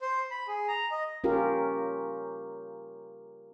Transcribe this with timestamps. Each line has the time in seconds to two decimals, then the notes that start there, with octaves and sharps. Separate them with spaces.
0.01 C5
0.31 B5
0.48 G#4
0.68 A#5
0.91 D#5
1.24 C#4 F4 G4 A#4